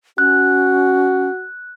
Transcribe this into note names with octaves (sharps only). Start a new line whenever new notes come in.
C#4 F#4 F#6